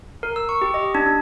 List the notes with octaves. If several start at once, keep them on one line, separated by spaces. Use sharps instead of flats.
A#4
E6
C#6
G4
D#5
D4
D4